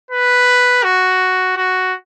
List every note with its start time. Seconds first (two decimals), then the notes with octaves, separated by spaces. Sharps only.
0.11 B4
0.84 F#4
1.57 F#4